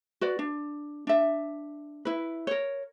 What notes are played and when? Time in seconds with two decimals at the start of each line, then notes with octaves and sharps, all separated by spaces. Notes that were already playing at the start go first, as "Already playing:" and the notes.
0.21 F#4 B4 D5
0.39 D4
1.07 D4 E5
2.05 E4 B4
2.47 A#4 C#5